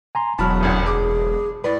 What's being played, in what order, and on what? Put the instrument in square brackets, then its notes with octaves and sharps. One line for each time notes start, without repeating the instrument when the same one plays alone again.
[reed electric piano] G#5 A#5 C6
[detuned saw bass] E1 [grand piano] B2 [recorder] F#3 [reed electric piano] A5 B5 F6
[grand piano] D#1 G#1 D2
[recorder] G#4 [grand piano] D6
[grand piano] A2 [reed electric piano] B4 [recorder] D5